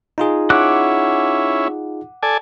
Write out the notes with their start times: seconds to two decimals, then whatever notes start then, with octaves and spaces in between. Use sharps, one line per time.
0.18 D#4 F4 G#4
0.50 C#4 E4 F#5 D6 F#6
2.23 A4 D5 G#5